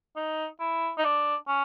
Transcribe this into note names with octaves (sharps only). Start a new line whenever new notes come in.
D#4
E4
D#4
D4
C#4